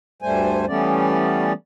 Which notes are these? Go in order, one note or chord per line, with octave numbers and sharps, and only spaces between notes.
D2 G2 G3 A3 C5 G#5
E3 G3 A3 B3 C#4 D5